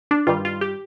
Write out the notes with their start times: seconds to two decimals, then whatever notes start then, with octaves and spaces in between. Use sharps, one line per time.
0.11 D4
0.27 G2 D#3 G3 F4
0.45 F4
0.61 G4